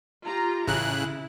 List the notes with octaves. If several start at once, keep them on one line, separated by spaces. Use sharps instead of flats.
F4 G4 A#5
A1 C#3 E4 F#6